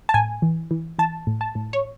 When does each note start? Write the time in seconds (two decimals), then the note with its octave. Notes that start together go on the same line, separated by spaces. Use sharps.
0.09 A5
0.14 A2 G#5
0.42 E3
0.71 E3
0.98 E3 A5
1.27 A2
1.41 A5
1.55 A2
1.73 C#5